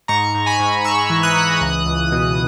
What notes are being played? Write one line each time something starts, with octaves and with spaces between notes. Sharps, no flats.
G#2 A#5 C#6
G#2
G#5 B5
G#2
G#2 C#6 E6
E3
D#6 F#6
E3
C#2
C#2
B2